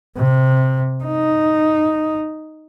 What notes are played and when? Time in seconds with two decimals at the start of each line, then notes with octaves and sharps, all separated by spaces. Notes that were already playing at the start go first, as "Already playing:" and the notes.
0.17 C3
1.04 D#4